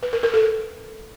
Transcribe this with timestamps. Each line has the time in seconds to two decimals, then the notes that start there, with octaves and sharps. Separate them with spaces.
0.03 B4
0.13 A#4
0.23 A#4
0.34 A4